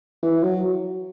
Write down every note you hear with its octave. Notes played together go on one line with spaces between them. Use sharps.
E3
F#3